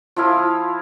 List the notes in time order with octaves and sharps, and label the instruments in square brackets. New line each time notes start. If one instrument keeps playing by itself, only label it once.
[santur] F3 E4 F5 D#6